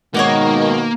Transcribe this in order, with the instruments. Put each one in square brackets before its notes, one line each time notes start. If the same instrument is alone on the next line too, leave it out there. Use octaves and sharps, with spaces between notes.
[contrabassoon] G#2 [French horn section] B2 D#3 [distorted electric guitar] A#3 [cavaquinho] C#5 D#5 F#5